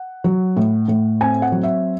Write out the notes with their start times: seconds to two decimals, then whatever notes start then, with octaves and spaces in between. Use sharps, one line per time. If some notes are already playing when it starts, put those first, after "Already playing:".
Already playing: F#5
0.24 F#3
0.56 A2
0.88 A2
1.21 C4 G#5
1.42 F#5
1.52 F#3
1.63 E5